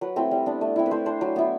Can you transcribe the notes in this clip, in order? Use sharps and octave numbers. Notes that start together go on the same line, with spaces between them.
F#3 B4
A3 C4 E4
G3
B3 D4
A3
C4 E4
B4
A3 C5
D4 C5
F#3
B3 E4